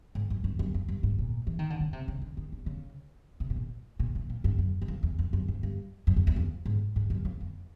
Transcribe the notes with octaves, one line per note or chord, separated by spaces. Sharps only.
G#2
F#2
G2
F#2
F2
G2
G#2
A#2
E3
D#3
D3
C#3
C3
C#3
D3
D#3
D3
C#3
C3
A2
A#2
A#2
A#2
A#2
G2
F#2
F#2
F2
E2
F2
F#2
G#2
G2
F#2
F2
E2
F2
G#2
G#2
F#2
F2
F2